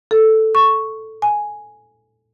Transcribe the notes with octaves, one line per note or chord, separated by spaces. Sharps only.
A4
C#6
G#5